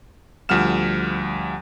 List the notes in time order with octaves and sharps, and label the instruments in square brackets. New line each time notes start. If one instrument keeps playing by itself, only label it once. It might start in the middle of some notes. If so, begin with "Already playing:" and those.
[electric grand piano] D2 F3 G3 F#5 F6 E7